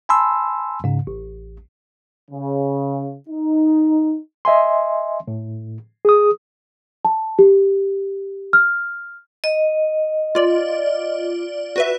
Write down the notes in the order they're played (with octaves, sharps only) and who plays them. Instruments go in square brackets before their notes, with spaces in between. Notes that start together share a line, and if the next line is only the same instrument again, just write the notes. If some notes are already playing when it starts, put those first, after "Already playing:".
[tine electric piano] G#5 A5 B5 C6 E6
G#2 C#3
A1
[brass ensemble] C#3
D#4
[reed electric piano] D#5 E5 G#5 C6
A2
G#4 D#6
[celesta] A5
G4
F6
[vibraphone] D#5
[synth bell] F4 D5
F#4 B4 E5